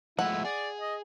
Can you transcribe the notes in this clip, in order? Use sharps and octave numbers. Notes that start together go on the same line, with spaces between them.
F3 G#3 A3 E4 F#5
G#4 D5
D#5